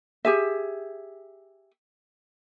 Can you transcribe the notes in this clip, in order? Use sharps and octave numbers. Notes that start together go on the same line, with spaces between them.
G4 G#4 E5